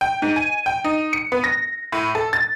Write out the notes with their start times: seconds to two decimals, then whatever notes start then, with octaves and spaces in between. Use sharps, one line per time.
0.01 G5
0.22 G#2
0.36 G#5
0.66 G5
0.84 D#4
1.13 C#7
1.32 B3
1.44 A#6
1.92 A2
2.15 A4
2.33 A6